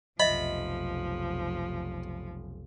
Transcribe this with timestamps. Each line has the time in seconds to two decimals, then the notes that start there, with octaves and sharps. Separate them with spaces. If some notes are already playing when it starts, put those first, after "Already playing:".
0.20 F1 B1 F3 D#5 E5 B5